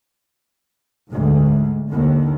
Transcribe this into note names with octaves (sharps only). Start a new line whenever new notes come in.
D2 G#2
D#2 D3